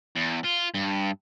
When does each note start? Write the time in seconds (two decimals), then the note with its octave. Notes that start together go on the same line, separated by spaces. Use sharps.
0.16 E2
0.44 F4
0.74 G2